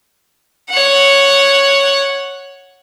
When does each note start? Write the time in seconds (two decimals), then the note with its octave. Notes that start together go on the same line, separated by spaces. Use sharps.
0.70 C#5 F#5